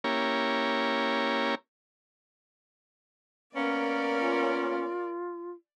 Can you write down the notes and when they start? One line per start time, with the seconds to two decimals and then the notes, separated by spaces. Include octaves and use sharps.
0.04 A#3 C#4 E4 G4 A#4 C#5
3.55 A#3 B3 C#4 A#4 D5
4.20 F4